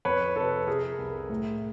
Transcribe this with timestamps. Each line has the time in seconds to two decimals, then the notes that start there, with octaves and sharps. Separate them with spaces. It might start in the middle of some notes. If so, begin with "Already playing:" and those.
0.05 F2 B4 C#5
0.36 C3 A4 B4
0.67 C3 G#4 A#4
0.98 C2
1.30 A2